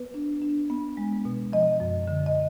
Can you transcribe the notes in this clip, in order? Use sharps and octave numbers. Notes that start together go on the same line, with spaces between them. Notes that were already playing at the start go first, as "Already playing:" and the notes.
Already playing: B3 B4
D4
D4
B3
G#3
B2
F3 D#5
F#2
D3
D#5